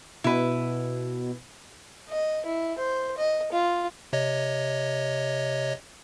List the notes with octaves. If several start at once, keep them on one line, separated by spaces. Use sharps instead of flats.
B2 E4 B4
D#5
E4
C5
D#5
F4
C3 C#5 D#5